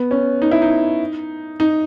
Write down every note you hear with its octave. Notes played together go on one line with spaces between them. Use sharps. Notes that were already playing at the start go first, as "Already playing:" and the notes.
Already playing: B3
C#4
D#4
E4
D#4
D#4